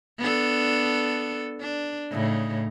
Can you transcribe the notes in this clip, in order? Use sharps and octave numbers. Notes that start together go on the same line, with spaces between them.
B3 D4 A4
D4
A2 C#3 D#4